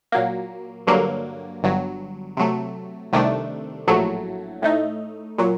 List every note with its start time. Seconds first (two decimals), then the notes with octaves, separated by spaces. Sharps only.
0.12 A#2 F#3 A#3
0.87 G2 D3 F#3 A#3
1.63 G1 G2 F#3
2.37 C3 F#3 A3
3.13 C2 C3 D#3 A3 D4
3.87 A#1 A2 F#3 A3
4.62 A2 A3 D#4
5.38 A#2 F#3